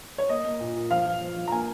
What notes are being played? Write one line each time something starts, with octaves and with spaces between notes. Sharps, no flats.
C#5
A#3 D#5
A#3
A#2
A#2
F3 F5
F3
F3
F3
A#5
A#3 G#5